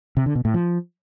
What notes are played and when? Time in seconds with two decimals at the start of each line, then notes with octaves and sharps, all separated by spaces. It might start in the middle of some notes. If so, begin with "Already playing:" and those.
0.17 C3
0.26 D3
0.35 B2
0.45 A2
0.54 F3